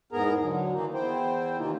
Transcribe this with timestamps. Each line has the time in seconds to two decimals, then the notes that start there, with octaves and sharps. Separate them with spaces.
0.12 E2 G#2 B3 G#4 A#4 A#5
0.42 D3 F#3
0.72 D#3 E3 A#3 D#4
0.94 E2 E4 C5 G5
1.58 C3 D#3 E3 A#3 D#4 F4